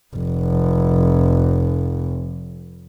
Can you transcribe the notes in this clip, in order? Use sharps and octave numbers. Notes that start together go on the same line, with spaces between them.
F1 F2